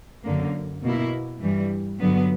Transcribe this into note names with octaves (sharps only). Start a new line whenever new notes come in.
F#2 D3 A#3
B2 A#3 E4
G2 E3 G3
G2 D3 F#3 B3